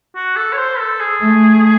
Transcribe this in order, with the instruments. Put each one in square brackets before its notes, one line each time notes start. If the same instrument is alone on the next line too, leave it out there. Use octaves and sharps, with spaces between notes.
[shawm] F#4
A4
C#5
C5
A4
G#4
[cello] A3